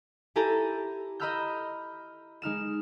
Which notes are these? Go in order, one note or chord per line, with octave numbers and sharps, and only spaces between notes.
E4 G4 A4 G#5 A#5
D#5 A#5 B5 E6 F6 G6
G#3 D#4 F6 E7